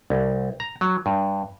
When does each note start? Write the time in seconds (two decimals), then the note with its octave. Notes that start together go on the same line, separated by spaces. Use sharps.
0.10 C2
0.60 A#5
0.81 F#3
1.06 G2